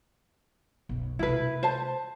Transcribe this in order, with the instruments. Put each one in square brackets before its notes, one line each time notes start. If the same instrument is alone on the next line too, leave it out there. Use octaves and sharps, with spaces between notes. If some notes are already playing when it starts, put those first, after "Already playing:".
[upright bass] B1 F#2
[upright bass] C3 A3 [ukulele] E4 B4
[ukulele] C5 A5